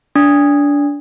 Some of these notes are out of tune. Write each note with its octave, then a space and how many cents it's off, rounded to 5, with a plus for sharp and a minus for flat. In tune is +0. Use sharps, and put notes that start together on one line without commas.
D4 -25